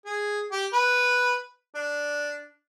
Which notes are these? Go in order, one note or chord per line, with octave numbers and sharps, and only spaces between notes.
G#4
G4
B4
D4